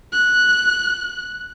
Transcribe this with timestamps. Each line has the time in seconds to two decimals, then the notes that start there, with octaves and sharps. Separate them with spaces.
0.13 F#6